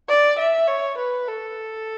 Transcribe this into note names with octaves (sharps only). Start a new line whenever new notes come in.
D5
E5
C#5
B4
A4